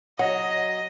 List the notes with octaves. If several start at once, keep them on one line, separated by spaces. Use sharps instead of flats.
F#3 D#5 F#5